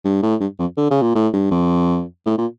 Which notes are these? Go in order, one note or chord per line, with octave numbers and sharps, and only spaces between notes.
G2
A2
G2
F2
D3
C#3
A#2
A2
G2
F2
A2
A#2